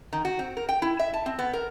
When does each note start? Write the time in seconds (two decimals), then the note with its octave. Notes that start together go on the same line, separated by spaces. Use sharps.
0.13 D#3
0.25 F#4
0.39 C4
0.57 A#4
0.69 G5
0.82 E4
0.99 E5
1.14 A5
1.26 C4
1.39 B3
1.53 A#4